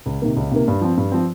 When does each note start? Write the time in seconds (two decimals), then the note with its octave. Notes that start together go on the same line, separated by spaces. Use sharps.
0.06 C#2
0.22 C3 D#3 A#3
0.37 C#2
0.51 C3 D#3 A#3
0.68 G2
0.82 F3 C4
0.97 G2
1.12 F3 C4